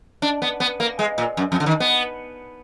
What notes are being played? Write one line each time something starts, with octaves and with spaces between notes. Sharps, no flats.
D4
B3
B3
A#3
G#3
A#2
F#2
F2
D3
D#3
B3